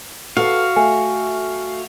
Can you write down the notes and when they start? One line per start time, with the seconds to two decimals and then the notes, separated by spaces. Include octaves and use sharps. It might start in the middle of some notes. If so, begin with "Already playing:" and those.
0.37 F#4 A4 B4 F5
0.76 A3 G#5